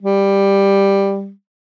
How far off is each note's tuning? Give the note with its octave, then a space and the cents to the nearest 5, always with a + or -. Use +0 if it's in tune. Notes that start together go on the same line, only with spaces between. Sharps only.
G3 +10